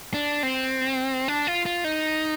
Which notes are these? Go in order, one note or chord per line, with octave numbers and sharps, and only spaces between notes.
D4
C4
D4
F4
F4
D#4